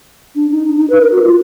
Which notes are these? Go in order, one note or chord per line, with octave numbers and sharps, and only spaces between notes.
D4
D#4
D4
D#4
B4
A#4
F#4
F4